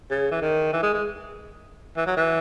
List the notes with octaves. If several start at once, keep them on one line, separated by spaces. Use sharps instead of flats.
C#3
E3
D#3
E3
G#3
G#3
E3
F#3
E3